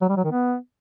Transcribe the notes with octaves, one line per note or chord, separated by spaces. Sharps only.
F#3
G3
F#3
D#3
B3